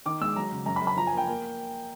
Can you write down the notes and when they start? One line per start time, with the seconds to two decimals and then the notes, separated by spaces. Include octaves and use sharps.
0.06 D#3 D6
0.21 G#3 E6
0.36 F#3 A#5
0.52 C#3
0.66 F#2 A#5
0.76 B5
0.82 F#2
0.87 B5
0.97 F3 A#5
1.07 G#5
1.13 A#3 G5
1.27 A#3